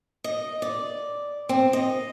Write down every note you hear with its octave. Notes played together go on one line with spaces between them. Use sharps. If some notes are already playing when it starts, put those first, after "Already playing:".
D#5
D5
C4
D#5